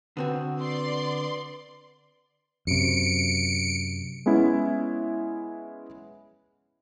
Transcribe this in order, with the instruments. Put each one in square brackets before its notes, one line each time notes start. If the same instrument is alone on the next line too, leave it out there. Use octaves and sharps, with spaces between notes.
[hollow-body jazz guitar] D3 C4 F#4 [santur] B3 B4
[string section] D5 C6
[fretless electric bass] F#2 C3 [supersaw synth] C#7 D7
[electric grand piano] G#3 B3 C#4 E4